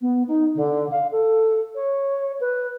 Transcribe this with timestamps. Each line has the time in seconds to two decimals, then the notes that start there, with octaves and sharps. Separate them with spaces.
0.01 B3
0.28 D#4
0.55 D3
0.91 F5
1.11 A4
1.75 C#5
2.40 B4